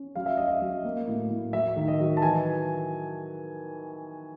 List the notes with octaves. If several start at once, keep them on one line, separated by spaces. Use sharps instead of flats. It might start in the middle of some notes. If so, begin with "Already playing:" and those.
Already playing: C#4
F#3 F5
E5
F#3 D#5
E5
F#3
A#3
A2
A2
F#3 E5
D#3
D#5
F#3
A5
E3 G#5